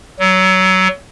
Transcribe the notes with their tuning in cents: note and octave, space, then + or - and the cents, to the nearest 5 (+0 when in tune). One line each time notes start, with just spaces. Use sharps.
F#3 +25